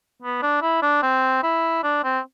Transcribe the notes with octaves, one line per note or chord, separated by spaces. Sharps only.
B3
D4
E4
D4
C4
E4
D4
C4